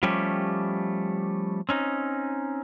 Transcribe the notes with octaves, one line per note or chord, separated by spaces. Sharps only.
F3 G3 A3 C#4 G4
C4 C#4 D#4